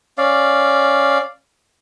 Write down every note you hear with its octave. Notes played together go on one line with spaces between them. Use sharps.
C#4 D5 F5